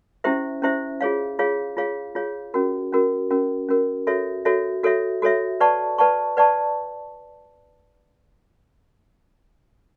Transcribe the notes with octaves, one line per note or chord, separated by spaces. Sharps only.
C#4 E4 G4 C5 E5
C#4 E4 G4 C5 E5
F4 G#4 C#5 F5
F4 G#4 C#5 F5
F4 G#4 C#5 F5
F4 G#4 C#5 F5
C#4 F#4 A#4
C#4 F#4 A#4
C#4 F#4 A#4
C#4 F#4 A#4
F#4 A4 C#5 E5
F#4 A4 C#5 E5
F#4 A4 C#5 E5
F#4 A4 C#5 E5
B4 D5 F#5 A5 C#6
B4 D5 F#5 A5 C#6
B4 D5 F#5 A5 C#6